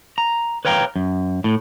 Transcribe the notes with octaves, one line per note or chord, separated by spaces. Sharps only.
A#5
B4 C#5 F5 G5 A#5
F#2
A2